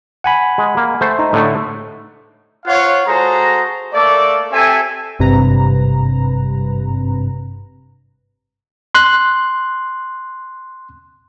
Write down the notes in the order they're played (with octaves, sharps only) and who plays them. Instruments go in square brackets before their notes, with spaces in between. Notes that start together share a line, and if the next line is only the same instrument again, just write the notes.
[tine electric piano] F#5 G#5 B5
[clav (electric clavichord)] G#3
A#3
A3 C5
[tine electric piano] D#4
[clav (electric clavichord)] A2 D3 A3
[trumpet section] F4 C5 C#5 F5 F#5
G#3 F#4 G#4 A4 C5 A#5
A3 A#3 A4 D5
C4 G4 A4 E5 G#5
[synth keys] G#1 G2 C3 B4 A#5
[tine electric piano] C6 F#6